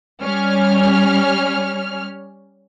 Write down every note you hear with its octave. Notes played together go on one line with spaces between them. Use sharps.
G3 C#4 F6